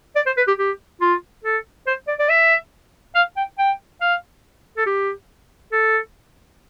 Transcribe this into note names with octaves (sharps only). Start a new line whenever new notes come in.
D5
C5
B4
G4
G4
F4
A4
C5
D5
D5
E5
F5
G5
G5
F5
A4
G4
A4